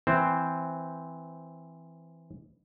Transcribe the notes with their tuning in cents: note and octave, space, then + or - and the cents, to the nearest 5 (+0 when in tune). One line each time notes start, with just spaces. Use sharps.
E3 +0 C4 -5 C5 +0